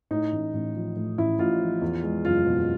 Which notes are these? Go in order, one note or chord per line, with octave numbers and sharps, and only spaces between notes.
A2 D#4
A1
A1
F3
A2
A1 E4
A1 F4
F3
E2
G#3
F#1 F4
B2